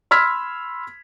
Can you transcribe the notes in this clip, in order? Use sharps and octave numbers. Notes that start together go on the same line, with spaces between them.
B5 C6 E6 F6 G#6 B6